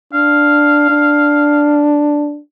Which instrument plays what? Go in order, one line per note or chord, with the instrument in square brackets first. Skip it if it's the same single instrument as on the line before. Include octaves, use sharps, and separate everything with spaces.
[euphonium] D4 [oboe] F5
[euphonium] D4